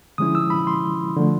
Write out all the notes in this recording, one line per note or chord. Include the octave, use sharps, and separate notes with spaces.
D3 F3 G#3 C#4 E4 D#6
E6
B5
C6
D3 F3 A3